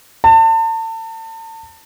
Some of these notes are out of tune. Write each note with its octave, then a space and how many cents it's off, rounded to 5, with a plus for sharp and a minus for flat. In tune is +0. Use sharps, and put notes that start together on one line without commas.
A5 +35